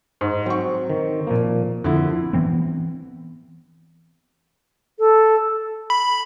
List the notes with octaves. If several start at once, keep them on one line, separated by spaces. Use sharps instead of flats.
G#2
F#3 C4 C#6
D#3
A#2 F3 A#3
F2 D3 E4
E3 B3 C4
A4
B5